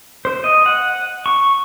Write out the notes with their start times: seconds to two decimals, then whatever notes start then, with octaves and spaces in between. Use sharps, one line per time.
0.25 C5
0.44 D#5
0.66 F#5
1.26 C#6